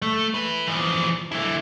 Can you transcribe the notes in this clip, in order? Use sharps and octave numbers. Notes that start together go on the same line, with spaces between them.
A3
E4 B4
E3 F3
D3 E4